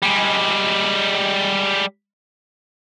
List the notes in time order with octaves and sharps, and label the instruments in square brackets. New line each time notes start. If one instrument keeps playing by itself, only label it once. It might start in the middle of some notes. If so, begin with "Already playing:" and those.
[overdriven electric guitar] G3 G#3